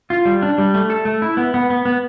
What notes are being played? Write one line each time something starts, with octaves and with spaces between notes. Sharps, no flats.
F4
G3
D4
G3
A3
A4
A3
E4
B3
B3
B3
B3